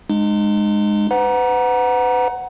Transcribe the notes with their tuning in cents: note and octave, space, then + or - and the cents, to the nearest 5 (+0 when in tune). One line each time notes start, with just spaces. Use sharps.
G#3 +0 D#4 -40
B4 +35 F#5 +0 A#5 +25